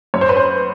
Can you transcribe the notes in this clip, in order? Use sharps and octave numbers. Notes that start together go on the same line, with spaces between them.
F#2 C#5
C5
B4
C5